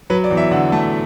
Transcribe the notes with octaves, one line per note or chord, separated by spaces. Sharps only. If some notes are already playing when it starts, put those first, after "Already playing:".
F#3 B4
D5
E2
E5
D3 F#5
A3 A5